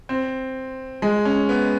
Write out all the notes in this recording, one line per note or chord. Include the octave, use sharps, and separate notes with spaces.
C4
G#3
C#4
B3